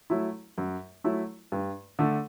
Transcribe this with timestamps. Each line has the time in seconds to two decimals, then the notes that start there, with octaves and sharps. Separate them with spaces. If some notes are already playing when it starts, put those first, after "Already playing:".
0.10 F#3 A3 E4
0.58 F#2
1.04 F#3 A3 E4
1.52 G2
1.99 D3 A3